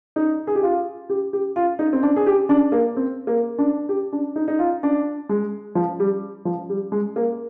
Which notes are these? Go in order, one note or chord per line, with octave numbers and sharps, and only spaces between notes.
D#4
G#4
G4
F4
G4
G4
F4
D#4
C4
D4
G#4
G4
D4
A#3
C4
A#3
D4
G4
D4
D#4
D#4
F4
D4
G#3
F3
G3
F3
G3
G#3
A#3